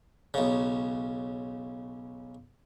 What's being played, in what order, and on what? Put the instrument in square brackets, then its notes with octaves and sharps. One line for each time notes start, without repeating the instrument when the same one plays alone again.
[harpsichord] B1 C#3